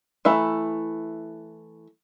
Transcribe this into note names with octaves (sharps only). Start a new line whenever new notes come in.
E3 A3 E5 A#5 B5